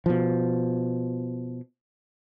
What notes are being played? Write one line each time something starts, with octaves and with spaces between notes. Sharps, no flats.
B2 F3